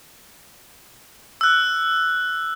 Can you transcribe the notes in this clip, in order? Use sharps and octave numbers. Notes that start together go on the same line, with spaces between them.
E6 F#6